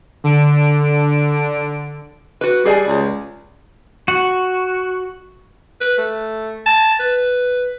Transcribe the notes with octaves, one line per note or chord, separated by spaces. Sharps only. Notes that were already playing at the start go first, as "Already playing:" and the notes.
D3 D7
F#4 B4
G3 G#4 D5 G#5
C#2
F#4
B4
A3
A5
B4